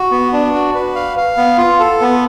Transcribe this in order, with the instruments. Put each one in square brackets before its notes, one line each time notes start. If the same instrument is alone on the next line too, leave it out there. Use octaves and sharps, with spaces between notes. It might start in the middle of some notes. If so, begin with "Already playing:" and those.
Already playing: [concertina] F#4
B3
D4
F#4
B4
F5
F5
B3
F4
A4
B3